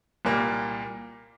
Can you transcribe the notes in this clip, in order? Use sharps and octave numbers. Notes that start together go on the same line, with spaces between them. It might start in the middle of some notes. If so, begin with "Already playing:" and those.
C2 A#2 G3 A#3